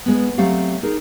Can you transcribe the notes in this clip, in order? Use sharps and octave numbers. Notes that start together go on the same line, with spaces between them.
G#3 B3
F#3 A3 C4 G4 F5
D#4 G#4 A#4